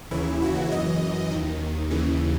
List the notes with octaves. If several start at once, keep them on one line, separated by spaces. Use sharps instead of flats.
D#2 C#3 E3 E4
F#4
F#2 E3 D#5
D#2 D#3
D#2 C#3 E3